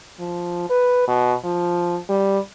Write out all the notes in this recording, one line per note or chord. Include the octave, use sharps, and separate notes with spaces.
F3
B4
B2
F3
G3